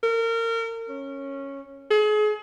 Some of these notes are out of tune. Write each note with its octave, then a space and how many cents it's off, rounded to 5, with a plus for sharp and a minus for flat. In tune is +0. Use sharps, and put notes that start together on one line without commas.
A#4 -30
C#4 -10
G#4 +35